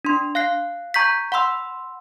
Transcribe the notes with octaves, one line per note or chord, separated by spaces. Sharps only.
D4 C6
F5 F#6 C7
A#5 C#6 G6 G#6 B6
F#5 B5 C6 E6